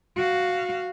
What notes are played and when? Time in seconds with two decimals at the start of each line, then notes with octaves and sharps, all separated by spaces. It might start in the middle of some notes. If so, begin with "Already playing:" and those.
0.16 F#4 F5